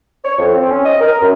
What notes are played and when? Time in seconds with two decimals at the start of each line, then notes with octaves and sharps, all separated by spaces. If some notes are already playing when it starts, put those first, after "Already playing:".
0.24 C#5
0.38 F2
0.54 C4
0.69 C#4
0.85 D#5
1.01 A#4
1.21 F#2